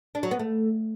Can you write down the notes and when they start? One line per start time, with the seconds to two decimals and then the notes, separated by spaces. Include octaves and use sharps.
0.15 D4
0.23 F#3
0.31 B3
0.39 A3